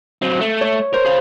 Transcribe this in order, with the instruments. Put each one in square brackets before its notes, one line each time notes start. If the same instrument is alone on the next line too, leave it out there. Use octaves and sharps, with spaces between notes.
[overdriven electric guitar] F#3 C4
A3
[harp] C#5
[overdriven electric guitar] A#4 [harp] C5
[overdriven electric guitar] G#4 F5